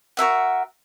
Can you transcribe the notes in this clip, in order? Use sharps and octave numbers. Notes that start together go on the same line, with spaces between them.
F#4 A#4 E5 F#5